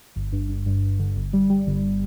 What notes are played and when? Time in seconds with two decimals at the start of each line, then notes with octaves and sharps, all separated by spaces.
0.16 G1
0.32 G2
0.49 G2
0.66 G2
0.82 G2
0.99 D3
1.16 G1
1.33 G3
1.50 G3
1.67 G1